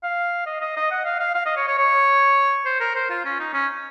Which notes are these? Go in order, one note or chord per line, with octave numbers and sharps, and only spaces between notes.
F5
D#5
D#5
D#5
F#5
F5
F5
F5
D#5
C#5
C#5
C#5
C5
A#4
C5
F4
C#4
D#4
C#4